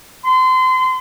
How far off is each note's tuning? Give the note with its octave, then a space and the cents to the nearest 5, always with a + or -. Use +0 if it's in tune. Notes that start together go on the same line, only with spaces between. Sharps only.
C6 -30